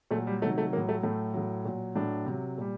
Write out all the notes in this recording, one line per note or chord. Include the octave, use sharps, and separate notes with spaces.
A#2 F#3 A3
G3
C3 D#3 F#3 A3
A3
A2 F#3 A#3
A3
A2 F#3 A3
A2 F#3
A#2 F#3
A2 F#3 D4
C3 F#3
A#2 G3